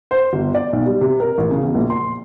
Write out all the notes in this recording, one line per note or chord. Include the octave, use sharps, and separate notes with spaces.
C5
G1
D5
B1
G3
C3
A#4
A1
C#3
E2
A#1
C6